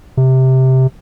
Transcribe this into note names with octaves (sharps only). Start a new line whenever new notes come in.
C3